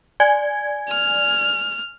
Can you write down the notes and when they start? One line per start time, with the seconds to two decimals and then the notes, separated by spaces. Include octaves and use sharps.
0.20 D5 G#5 G#6
0.90 F6